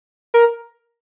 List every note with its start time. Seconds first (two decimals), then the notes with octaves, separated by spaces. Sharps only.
0.34 A#4